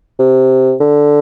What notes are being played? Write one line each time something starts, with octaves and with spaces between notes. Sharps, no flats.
C3
D3